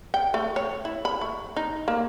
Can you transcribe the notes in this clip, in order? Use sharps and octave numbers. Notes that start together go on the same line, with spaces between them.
G5
A3
C#5
E4
B5
A3
D#4
A#3